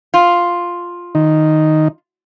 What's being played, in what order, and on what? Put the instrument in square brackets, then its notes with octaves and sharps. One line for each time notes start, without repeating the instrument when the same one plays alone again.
[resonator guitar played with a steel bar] F4
[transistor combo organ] D#3 D#4